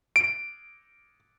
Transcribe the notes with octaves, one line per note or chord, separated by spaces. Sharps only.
D7